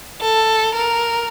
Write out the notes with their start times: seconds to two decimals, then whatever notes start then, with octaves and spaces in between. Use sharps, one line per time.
0.21 A4
0.75 A#4